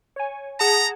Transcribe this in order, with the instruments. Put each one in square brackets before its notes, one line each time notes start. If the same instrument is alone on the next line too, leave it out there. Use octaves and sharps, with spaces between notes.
[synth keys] C#5 G#5
[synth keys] G#4 F#5 A5 [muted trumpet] A#5